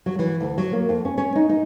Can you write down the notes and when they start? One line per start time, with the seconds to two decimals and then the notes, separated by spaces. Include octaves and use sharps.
0.06 F#3
0.19 E3
0.40 D2
0.58 F#3
0.73 A#3
0.89 F2
1.05 C#4
1.18 C#4
1.35 D#4
1.49 D#4